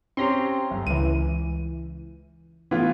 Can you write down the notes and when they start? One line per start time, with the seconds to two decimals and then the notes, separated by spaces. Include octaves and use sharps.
0.17 C4 C#4 G4 A#5 C6
0.71 G1
0.87 C#2 E3 D#7
2.71 A2 E3 B3 F4